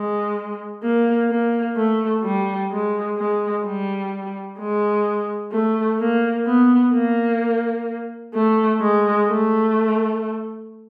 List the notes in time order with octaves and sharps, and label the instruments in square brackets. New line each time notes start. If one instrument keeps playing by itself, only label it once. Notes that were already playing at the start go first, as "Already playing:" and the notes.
Already playing: [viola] G#3
A#3
A#3
A3
G3
G#3
G#3
G3
G#3
A3
A#3
B3
A#3
A3
G#3
A3